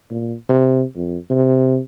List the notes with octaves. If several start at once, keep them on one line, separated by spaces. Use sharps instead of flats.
A#2
C3
F2
C3